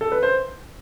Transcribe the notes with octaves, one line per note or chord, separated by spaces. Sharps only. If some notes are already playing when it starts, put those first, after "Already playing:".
A4
B4
C5